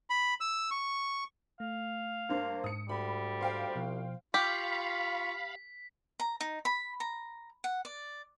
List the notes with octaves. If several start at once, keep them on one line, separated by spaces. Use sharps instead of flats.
B5
E6
C#6
A3 F5
G2 A#3 D4 C5
G#2 D#6 C#7
D2 G3 B5
C5 F5 G5
C2 B2 F3
F4 G4 F5 B5 C#6 B6
A#5
D#4
B5
A#5
F#5
D5